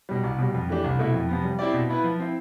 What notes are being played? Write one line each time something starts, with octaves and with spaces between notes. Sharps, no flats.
B2 G3
C2
B2 G3
F2
E3 A3 D4 G4
C2
B2 A3 E4
F2
C3 F3 B3
G3
C4 E4 G4 D5
B2
B3 E4 B4
F3
C4 E4